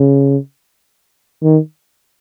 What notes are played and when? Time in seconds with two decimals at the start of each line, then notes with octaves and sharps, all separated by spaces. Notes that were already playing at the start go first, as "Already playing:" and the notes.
Already playing: C#3
1.42 D#3